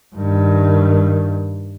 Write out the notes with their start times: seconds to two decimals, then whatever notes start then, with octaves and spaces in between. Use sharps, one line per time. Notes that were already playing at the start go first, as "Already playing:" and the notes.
0.16 G2 D#3